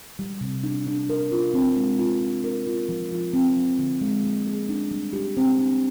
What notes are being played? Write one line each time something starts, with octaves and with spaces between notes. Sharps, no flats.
G3
C3
D4
D4
A#4
F4
C4
G#3
F4
D4
A#4
F4
F3
F4
C4
F3
D3
G#3
A#3
G#4
D4
G3
G4
C4
D4